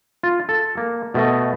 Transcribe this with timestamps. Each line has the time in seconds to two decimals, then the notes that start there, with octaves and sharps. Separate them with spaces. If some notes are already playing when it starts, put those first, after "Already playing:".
0.23 F4
0.49 A4
0.77 A#3
1.14 B2 A3 D#5